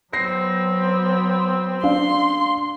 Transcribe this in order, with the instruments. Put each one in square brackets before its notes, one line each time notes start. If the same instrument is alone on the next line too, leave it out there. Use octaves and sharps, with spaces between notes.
[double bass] F#3 B3 [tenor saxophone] C4 [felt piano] A#6 C7
[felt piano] D4 F5 [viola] C6